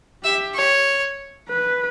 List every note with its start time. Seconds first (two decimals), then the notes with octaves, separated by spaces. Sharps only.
0.24 G4 E5
0.55 C#5
1.49 B4